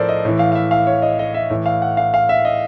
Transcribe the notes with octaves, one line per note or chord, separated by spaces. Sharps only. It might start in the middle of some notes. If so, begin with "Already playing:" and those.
Already playing: A2 F3 A4 A#4 C5 D5
D#5
A2 E3
F5
F5
E5
F5
C#5
D#5
D#5
E5
A2 E3
F5
F#5
F5
F5
E5
D#5